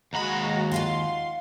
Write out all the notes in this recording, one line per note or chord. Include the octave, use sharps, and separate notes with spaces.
D#2 G#3 F#4 A#5 B5
F4 F5 F#5 C6